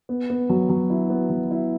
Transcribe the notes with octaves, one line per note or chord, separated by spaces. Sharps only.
B3
B3
F#3
F#3
E4
B3
F#3
E4